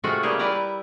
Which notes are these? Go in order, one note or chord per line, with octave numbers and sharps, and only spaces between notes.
C3 G#3 A3 F4 F#4 G#4
C#3 G3 A#3 G4 G#4
G3 E4 B4 D5 A#5
E5